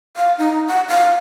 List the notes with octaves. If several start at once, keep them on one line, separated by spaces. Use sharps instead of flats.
F5
D#4
F#5
F5